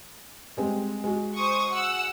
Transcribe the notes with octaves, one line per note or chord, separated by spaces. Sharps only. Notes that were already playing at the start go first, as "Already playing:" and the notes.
G3 G#3 C4
G#3 F#4
C5 C#6 D#6
F#5 E6